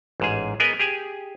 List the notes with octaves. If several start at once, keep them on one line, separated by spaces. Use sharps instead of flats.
A1 G#2 G#4
B3 G#4 A#4 B4 D#5 G#5
G4 G#4 G#5